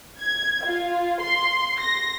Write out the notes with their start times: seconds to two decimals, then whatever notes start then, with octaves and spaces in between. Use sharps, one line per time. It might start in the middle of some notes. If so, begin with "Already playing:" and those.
0.20 G#6
0.65 F4
1.21 C6
1.81 A#6